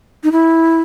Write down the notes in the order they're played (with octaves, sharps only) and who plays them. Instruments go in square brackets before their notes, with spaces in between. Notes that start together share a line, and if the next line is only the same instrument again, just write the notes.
[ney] D#4
E4